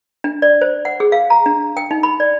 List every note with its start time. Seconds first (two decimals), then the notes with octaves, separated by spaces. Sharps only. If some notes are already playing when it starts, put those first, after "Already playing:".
0.24 D4
0.42 D5
0.61 C5
0.85 F#5
1.00 G#4
1.12 F5
1.30 A#5
1.46 D4
1.77 G5
1.91 D#4
2.03 B5
2.20 D5